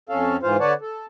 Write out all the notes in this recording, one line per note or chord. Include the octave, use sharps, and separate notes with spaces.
F2 C#4 A4 F5
G#2 E3 F4 C5 F5
D3 B4 C#5 D5 F#5 A5
A4